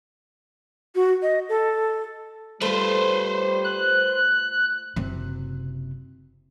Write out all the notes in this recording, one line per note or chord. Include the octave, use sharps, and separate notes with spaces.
F#4
D#5
A4
G3 A3 F4 B4 C5
F#6
F#1 C3